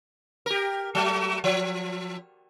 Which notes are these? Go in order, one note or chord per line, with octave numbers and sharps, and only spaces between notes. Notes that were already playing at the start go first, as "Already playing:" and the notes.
G4 A#4
F#3 A3
F3